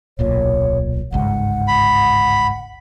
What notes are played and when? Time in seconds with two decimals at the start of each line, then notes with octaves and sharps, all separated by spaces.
0.19 D1 B1 A#2 C#5
1.12 G1 C#2 G#2 F#5
1.68 B5